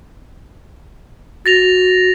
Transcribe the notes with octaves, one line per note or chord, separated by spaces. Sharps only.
F#4 A6 A#6 F7